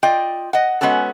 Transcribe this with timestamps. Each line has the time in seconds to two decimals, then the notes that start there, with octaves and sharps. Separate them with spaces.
0.03 F4 D5 D#5 G5
0.53 D#5 F#5
0.81 G#3 B3 C#4 F#4 A4